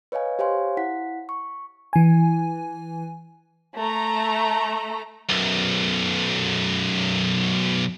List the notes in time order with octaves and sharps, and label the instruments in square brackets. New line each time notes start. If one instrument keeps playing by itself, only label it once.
[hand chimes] B4 C#5 D#5 F5 G#5
G4 C5 C#5 F5 G#5 C6
E4 F#5 B6
C#6
[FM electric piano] E3 G#5
[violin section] A3 A#5
[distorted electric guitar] B1 F#2